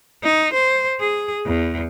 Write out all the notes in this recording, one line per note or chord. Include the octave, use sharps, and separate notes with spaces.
D#4
C5
G#4
E2